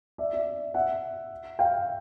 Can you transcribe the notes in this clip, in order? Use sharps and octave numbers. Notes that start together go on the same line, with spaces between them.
D5 E5
D5 E5
E5 F#5
F5 G5